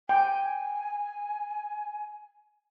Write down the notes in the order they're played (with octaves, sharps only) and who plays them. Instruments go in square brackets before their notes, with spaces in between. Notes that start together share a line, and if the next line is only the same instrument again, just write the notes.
[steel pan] G5 [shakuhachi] G#5